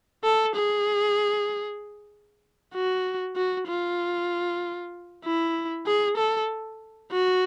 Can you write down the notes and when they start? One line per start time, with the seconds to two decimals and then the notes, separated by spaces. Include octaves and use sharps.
0.24 A4
0.56 G#4
2.74 F#4
3.36 F#4
3.68 F4
5.25 E4
5.87 G#4
6.18 A4
7.12 F#4